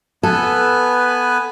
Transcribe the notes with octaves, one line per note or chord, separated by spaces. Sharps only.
B3 A4 B4 G#5